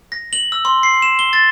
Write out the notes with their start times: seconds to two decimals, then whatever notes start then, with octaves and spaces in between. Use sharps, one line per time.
0.12 A#6
0.33 F#7
0.52 E6
0.65 C6
0.83 C7
1.02 E7
1.19 G7
1.33 A6